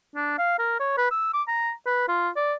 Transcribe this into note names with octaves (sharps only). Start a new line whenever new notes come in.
D4
F5
A#4
C#5
B4
E6
D6
A#5
B4
F4
D5